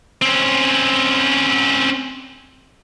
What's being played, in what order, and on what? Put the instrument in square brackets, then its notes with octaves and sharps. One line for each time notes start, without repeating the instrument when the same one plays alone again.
[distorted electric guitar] C4 C#4